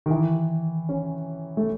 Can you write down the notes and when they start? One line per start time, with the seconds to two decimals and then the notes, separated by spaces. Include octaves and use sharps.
0.06 D#3
0.10 E3
0.89 C#4
1.57 A3